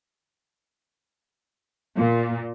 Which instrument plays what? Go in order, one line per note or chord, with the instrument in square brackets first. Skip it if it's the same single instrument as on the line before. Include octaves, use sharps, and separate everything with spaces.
[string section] A#2